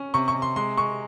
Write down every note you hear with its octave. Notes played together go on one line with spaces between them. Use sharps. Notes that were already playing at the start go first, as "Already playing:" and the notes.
Already playing: C#4
C3 C#6
C#6
C3
C6
G#3 C6
G#3 C#6